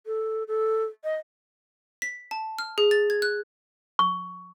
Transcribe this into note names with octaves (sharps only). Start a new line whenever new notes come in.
A4
A4
D#5
B6
A5
F6
G#4
A6
G#6
F#6
C#6